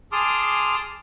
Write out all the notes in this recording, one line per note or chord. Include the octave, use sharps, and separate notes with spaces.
G#4 A5 C6 D6 D#6 F6